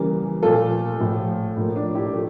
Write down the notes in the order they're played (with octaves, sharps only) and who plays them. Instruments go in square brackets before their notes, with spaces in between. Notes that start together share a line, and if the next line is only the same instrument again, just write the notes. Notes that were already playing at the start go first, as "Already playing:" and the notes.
Already playing: [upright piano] C#3 E3 G3 A#3
A#2 F3 A3 F4 A4
A2 F3 A3
A2 F3 A#3
D4
E4 G4
F3 A3